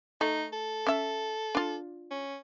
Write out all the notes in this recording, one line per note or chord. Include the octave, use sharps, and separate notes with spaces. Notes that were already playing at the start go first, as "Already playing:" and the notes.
A3 D#4
A4
C#4 E5
D4 F4
C#4